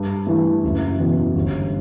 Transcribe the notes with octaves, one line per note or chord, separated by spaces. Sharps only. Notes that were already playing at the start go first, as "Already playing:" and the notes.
Already playing: G2
E3 A3
F#1
E2 B2
G1